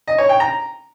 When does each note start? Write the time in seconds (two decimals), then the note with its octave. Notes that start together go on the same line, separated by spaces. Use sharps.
0.07 D#5
0.18 C#5
0.29 G5
0.40 A#5